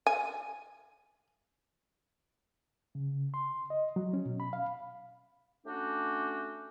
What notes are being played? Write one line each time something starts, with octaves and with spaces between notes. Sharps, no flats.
G#5
C#3
C6
D#5
F#3
C#4
B2
B5
F5
A3 C#4 D4 F#4 G4